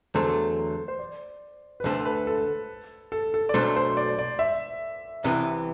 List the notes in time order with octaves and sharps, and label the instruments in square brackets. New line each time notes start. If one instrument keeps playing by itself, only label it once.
[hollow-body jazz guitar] E2 D3 F#3 A3 [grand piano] C5
[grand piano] C5
D5
B4
[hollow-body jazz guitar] D2 D3 A3 [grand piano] C5
[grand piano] B4
A4
A4
A4
D5
[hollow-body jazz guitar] B1 B2 F#3 A3 D4 [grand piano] C5
[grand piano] C5
D5
D5
E5
[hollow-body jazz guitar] C2 C3 E3 B3